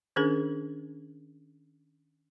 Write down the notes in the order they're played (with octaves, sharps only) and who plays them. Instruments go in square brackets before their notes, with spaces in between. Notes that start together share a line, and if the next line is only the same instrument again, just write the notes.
[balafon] D#3 C#4 D4 G#4 A#4